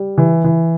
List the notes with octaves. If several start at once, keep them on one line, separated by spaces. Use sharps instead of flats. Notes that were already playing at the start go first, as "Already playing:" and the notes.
Already playing: G3
E3
E3